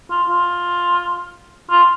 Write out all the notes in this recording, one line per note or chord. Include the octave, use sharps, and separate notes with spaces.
F4
F4
F4